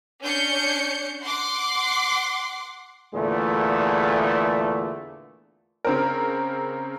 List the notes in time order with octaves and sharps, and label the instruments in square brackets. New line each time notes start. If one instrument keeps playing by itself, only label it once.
[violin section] C#4 D4 G6 C#7
F#5 C6 D6 C7
[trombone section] E2 A#2 D3 A3
[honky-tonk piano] C#3 C4 A#4